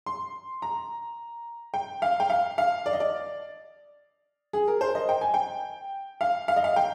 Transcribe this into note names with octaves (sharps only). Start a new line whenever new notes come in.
C6
A#5
G5
F5
G5
F5
F5
D5
D#5
D5
G#4
A#4
C5
D#5
G5
G#5
G5
F5
F5
D#5
F5
G5